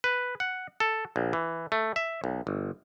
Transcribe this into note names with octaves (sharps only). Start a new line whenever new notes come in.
B4
F#5
A4
A#1
E3
A3
E5
B1
G1